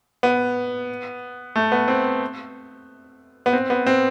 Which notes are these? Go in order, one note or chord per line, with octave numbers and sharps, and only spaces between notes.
B3
A3
B3
C4
B3
C4
B3
C4